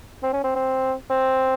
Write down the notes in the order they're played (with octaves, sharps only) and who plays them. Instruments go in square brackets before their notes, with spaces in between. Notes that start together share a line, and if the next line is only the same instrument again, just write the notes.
[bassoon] C4
C#4
C4
C4
C4